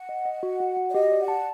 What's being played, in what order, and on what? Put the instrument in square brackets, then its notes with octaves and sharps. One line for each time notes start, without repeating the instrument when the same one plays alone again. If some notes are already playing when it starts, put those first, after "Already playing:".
Already playing: [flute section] F#5
[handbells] D#5
D#5
F#4
F#4
F#4
[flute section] D5
[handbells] G4 [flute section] D#5
[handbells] D5
[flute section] F#5
[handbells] A5